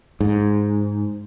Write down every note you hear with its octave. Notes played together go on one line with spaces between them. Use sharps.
G#2